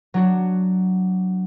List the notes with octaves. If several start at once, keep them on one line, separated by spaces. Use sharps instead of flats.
F#3 D4 F#4